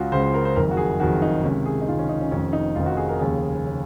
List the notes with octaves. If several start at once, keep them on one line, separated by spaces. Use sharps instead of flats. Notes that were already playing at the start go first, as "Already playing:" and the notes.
Already playing: C#2 C#3 F4 F#4
C#2 C#3 C5
C5
A#4
C5
F#1 F2 D#3 A#4
F#4
G#4
F#1 F2 D#3 F#4
D#4
C#2 C3 D#3 C#4
G#4
D#4
C#2 C3 D#3 F4
C#4
D#4
C#4
F1 F2 D#3 C#4
D#4
F1 F2 D#3 F4
F#4
G#4
A#4
F1 D#2 C#3 G#4
C#3